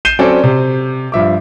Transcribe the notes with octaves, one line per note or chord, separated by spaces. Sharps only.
G6 C7 D#7 E7 G7
F#3 C4 C#4 A4 C#5 D5
C3
G2 F3 E5 D6